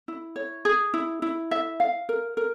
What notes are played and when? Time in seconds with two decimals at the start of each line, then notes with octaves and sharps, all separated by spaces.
0.08 E4
0.36 C#5
0.65 G#4
0.94 E4
1.22 E4
1.51 E5
1.80 F5
2.09 A#4
2.37 A#4